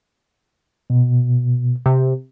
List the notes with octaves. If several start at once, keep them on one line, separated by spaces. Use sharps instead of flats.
B2
C3